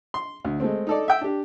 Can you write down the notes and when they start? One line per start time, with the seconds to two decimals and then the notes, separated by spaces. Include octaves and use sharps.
0.14 C6
0.45 D2
0.60 G#3 A3 C4
0.87 D#4 A4 D5
1.08 E5 G5
1.21 D4 G4